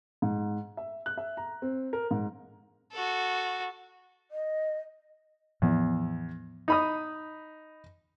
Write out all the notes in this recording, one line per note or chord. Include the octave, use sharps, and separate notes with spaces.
G#2
E5
F#6
E5
A#5
C4
A#4
G#2
F#4 A4
D#5
E2 A2 F3 B3
D#4 B5 D#6